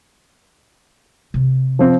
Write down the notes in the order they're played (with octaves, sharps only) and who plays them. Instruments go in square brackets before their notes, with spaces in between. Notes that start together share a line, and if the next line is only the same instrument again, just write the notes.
[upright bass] C3
[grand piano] F3 C4